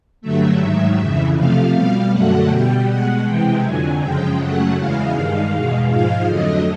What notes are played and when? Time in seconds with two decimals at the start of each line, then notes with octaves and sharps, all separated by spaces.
0.21 G2 D3 F#3 A3 E5
0.59 G#2 D#3 F#3
0.97 F2 C#3 E3
1.35 C3 F3 A3 F5
1.73 B2 G3 F5
2.11 F#2 D3 F#3 A3 F#5
2.49 B2 G3 G5
2.87 B2 G#3 F#5
3.24 C3 E3 G#3 G5
3.62 F2 D3 F#3 G#5
4.01 F#2 C#3 F3 G#3 G5
4.38 F#2 C#3 F#3 A3 F#5
4.76 E2 C#3 E3 G#3 F5
5.14 G2 D#3 G#3
5.52 E2 B2 G#3
5.90 G#2 F3 G#3 F5
6.28 F2 D3 F#3 A3 D#5